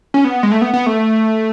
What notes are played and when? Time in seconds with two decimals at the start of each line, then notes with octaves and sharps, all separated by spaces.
0.14 C#4
0.24 B3
0.43 G#3
0.52 A3
0.62 B3
0.73 B3
0.86 A3